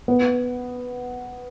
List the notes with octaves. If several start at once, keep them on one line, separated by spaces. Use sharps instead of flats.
B3